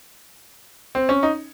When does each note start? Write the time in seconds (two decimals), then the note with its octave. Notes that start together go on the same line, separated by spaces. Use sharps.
0.95 C4
1.09 C#4
1.23 D#4